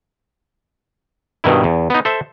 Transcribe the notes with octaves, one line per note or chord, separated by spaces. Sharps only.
G2 B2 D#3 E4
E2
B3 D#4
A4 C5 E5